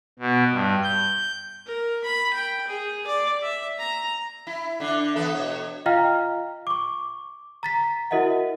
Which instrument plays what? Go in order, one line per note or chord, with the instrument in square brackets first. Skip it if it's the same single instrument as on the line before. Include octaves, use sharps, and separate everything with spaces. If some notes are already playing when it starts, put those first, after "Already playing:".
[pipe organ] B2
G2
G6
[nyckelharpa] A#4
B5
G5
G#4
D5
E5
A#5
[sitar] E4
D3 D4
E3 B3 A4
B2 C#5
[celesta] F4 D#5 F5 G5 A#5 F6
C#6 D6
A#5 A6 B6
E4 F#4 A#4 D#5 E5 F#5